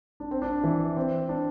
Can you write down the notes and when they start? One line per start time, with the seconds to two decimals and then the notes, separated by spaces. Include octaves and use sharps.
0.20 D4
0.31 C4
0.42 D4
0.64 E3
0.97 C4
1.29 D4